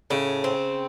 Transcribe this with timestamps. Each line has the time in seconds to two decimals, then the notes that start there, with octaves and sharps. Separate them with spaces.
0.10 A2 C#3
0.44 C4